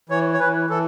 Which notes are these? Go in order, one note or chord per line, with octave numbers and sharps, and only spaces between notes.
E3 C#5
C#5
E3 B4
E3 A4